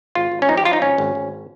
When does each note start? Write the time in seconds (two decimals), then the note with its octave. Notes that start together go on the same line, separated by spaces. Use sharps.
0.15 G#1 F4
0.32 G#1
0.42 C#4
0.49 F3 D#4
0.57 G4
0.65 F3 F4
0.73 D#4
0.82 G#1 C#4
0.98 G#1
1.15 G#1